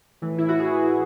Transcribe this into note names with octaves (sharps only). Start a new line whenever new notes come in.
A2 E3
E4
F#4
G#4